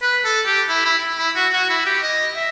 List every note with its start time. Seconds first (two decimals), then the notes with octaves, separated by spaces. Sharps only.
0.02 B4
0.25 A4
0.46 G4
0.69 E4
0.85 E4
1.19 E4
1.36 F#4
1.53 F#4
1.70 E4
1.86 G4
2.02 D#5
2.36 E5